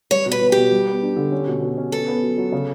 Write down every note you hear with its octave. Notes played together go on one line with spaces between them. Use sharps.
G3 C#5
B2
B4
B2
B2 G4
G3
B3
D4
D3
C#4
B2
B2
C#4
B3 A4
B3
F#3
F#3
C#3